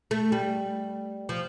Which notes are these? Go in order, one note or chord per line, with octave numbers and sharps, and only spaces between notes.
A3
G3
F3